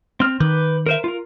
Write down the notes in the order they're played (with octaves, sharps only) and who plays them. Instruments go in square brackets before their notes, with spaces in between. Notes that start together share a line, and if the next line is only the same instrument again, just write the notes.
[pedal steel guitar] C4 F6
[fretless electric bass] D#3 [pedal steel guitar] B4 D6 G6
[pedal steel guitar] A#4 C5 E5
F4 A#4